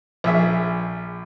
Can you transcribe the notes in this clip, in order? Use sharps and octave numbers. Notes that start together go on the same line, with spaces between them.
A#1 G#4 E5